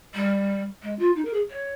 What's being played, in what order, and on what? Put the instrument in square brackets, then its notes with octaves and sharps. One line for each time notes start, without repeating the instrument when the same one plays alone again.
[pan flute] G3
G#3
F4
D#4
A#4
G#4
C#5